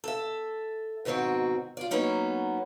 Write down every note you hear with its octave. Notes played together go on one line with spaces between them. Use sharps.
A4 E5
G#2 B2 D#3 C4 F#4
F4 D5
F#3 A#3 B3 C#4 D#4